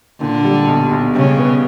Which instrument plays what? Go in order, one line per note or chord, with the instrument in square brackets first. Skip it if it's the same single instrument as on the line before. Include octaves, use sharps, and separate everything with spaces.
[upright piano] A#2 [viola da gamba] D3
[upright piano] G3
B1
B1
[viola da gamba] C#3 [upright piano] G3
[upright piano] B3